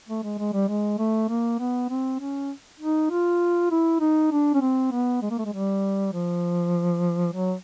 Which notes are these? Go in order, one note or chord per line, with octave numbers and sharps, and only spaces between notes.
A3
G#3
G#3
G3
G#3
A3
A#3
B3
C4
C#4
D#4
F4
E4
D#4
D4
C#4
C4
B3
G#3
A#3
A3
G#3
G3
F3
F#3